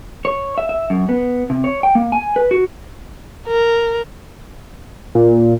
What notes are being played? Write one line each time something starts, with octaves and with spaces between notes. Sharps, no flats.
C#5
E5
E5
F#2
B3
C3
C#5
G5
A#3
G#5
B4
F#4
A#4
A#2